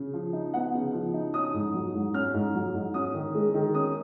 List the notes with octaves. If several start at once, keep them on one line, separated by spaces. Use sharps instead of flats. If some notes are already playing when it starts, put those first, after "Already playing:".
Already playing: C#3
F3
D#4
B3 F#5
C#3
F3
D#4
C#4 D#6
G#2
F#3
G#2
C#4 F6
G#2
F#3
G#2
C#4 D#6
D#3
G#3
D#3
C#4 D#6